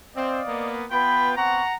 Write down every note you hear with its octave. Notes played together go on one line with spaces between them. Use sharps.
C4 D5 D#5 F5
A#3 B3
B3 F4 B4 G5 B5
B3 C4 F#5 A#5 C#6